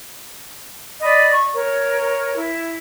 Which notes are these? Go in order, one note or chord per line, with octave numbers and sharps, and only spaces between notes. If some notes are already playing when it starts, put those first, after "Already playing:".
D5 D#5 B5
C#6
A#4 C#5
E4